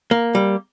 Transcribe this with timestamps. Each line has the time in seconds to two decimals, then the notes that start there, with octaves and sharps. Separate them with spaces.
0.11 A#3
0.35 G3